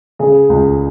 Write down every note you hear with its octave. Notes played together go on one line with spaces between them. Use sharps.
C#3 G#4
C#2